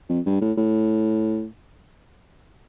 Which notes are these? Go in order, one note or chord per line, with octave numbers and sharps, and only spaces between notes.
F2
G2
A2
A2